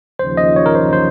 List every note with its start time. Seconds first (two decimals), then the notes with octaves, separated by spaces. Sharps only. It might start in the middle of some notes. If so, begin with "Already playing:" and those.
0.19 D#2 C#3 F3 C5
0.37 D#5
0.56 C#5
0.66 A#4
0.75 C5
0.93 C5